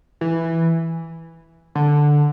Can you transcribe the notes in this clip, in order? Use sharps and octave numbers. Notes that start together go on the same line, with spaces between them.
E3
D3